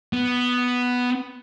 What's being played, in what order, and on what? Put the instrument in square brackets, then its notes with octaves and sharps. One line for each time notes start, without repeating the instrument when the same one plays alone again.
[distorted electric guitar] B3